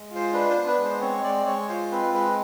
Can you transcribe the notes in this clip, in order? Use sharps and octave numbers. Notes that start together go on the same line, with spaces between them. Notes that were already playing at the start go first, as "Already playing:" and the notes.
Already playing: G#3
F4
C5
D4 B4
C5
B3
B4
G#3
C5
C4 C#5
G#3 D5
G#3 C#5
F4 C5
C4 B4
G#3 B4